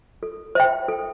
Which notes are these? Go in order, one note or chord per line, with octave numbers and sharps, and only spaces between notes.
A4
C5 E5 G5
A4